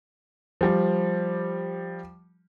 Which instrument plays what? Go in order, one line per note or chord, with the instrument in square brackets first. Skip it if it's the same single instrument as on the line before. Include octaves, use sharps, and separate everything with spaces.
[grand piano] F3 G3